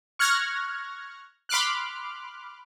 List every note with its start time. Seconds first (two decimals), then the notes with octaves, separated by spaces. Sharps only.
0.19 C#6 F6 F#6 G#6 A#6
1.49 B5 C6 D6 F6 F#6